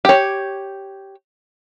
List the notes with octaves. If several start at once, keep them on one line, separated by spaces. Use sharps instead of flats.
G4 C#5